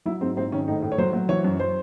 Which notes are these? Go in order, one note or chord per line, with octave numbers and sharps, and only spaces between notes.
F#3 E4
G#2 C4
G#2 C4
D#3 C#4
A2 D#4
A2
C#5
F#3 C5
F#3
E3 C#5
F#2
C5